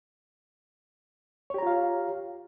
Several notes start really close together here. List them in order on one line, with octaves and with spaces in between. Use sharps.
C#5 G4 A#5 F4 F5